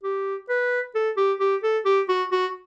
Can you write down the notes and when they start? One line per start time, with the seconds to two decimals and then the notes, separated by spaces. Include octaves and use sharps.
0.04 G4
0.49 B4
0.95 A4
1.17 G4
1.40 G4
1.63 A4
1.85 G4
2.08 F#4
2.31 F#4